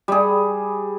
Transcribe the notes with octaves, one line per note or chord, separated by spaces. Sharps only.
G3 G#4